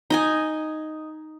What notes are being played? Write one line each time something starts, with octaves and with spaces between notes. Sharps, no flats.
D#4 D#5 G#5